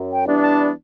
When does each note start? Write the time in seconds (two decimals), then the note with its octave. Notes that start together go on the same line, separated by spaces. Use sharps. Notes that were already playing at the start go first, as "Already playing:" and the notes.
Already playing: F#2
0.11 G5
0.27 E3 G3 B3 D4
0.41 A5